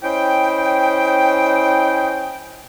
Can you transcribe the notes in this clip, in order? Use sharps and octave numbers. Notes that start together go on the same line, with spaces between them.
C#4 E4 C5 D#5 G5